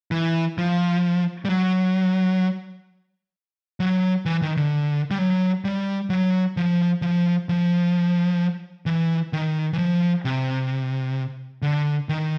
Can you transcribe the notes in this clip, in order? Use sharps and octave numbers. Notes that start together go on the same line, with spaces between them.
E3
F3
G3
F#3
F#3
E3
D#3
D3
G3
F#3
G3
F#3
F3
F3
F3
E3
D#3
E3
F3
C3
D3
D#3